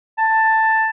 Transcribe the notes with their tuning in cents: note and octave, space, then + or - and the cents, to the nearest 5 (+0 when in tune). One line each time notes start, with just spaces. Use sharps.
A5 +10